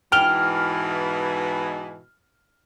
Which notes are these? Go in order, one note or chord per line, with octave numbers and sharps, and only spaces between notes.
G#2 B2 E3 G5 F6 F7 G7